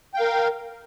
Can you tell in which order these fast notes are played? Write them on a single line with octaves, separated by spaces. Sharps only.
G5 F5 A#4